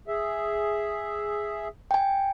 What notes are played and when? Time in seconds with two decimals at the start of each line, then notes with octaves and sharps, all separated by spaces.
0.08 G#4 E5
1.91 G5 G#5